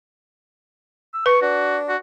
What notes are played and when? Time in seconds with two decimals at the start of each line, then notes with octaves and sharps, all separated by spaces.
1.14 E6
1.26 B4 C#6
1.42 D4 F#4
1.88 F#4